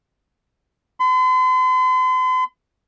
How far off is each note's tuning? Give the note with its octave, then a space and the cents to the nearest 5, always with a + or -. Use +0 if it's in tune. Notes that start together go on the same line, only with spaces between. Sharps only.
C6 -45